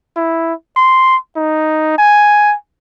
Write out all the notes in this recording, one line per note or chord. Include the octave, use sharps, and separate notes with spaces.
E4
C6
D#4
G#5